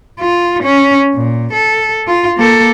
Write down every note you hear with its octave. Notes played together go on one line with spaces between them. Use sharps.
F4
C#4
A#2
A4
F4
A#3 A4